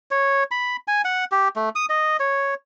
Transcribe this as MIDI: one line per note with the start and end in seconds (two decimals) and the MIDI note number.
0.11 0.43 73
0.51 0.76 83
0.88 1.02 80
1.05 1.25 78
1.32 1.48 67
1.56 1.69 57
1.75 1.86 87
1.89 2.17 75
2.20 2.54 73